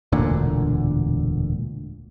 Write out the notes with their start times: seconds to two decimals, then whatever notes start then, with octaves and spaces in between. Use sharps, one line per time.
0.12 E1 D2 A#2 D3